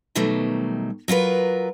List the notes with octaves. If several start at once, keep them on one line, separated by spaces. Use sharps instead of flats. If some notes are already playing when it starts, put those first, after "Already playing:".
B2 D#3 F#3 G3 A3
F#3 F4 A#4 B4